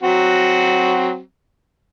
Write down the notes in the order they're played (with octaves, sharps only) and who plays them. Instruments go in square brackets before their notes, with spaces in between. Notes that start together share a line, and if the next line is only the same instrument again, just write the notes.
[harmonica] F#3 C4 F#4